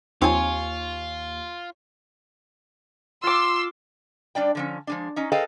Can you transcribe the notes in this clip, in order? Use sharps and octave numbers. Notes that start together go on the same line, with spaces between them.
D#2 F3 C4 D#4 F4 C#5 G#5
F4 C6 D6 E6
G3 D4 D5 G5
D3 F3 C#4
F3 G#3 D4
C#4 D#4
G#4 A4 B4 D#5 F5 G5